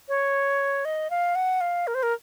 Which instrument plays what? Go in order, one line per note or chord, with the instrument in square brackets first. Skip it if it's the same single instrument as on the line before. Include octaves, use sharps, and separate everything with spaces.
[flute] C#5
D#5
F5
F#5
F5
A#4
C5
A#4